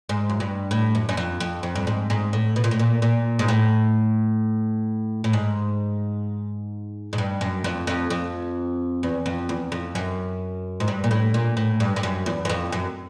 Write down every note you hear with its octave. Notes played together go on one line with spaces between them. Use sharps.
G#2
F#2
G2
A2
F#2
F#2
F2
F2
F2
G2
G#2
G#2
A2
B2
A#2
A2
A#2
A#2
G#2
A2
A2
G#2
G#2
G2
F#2
F2
F2
F2
E2
F2
E2
F2
F#2
G#2
G2
A#2
A2
A#2
A2
G2
G2
F#2
E2
F#2
F2
F#2